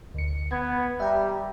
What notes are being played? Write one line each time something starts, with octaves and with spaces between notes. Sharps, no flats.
D2 C#7
B3 G#6
G3 E5 G5 A#5